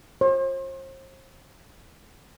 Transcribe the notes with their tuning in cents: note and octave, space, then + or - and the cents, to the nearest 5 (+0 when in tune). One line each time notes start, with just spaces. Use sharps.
C5 +40